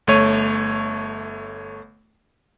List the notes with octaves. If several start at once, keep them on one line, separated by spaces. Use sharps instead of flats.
G1 A3 C#5 D#7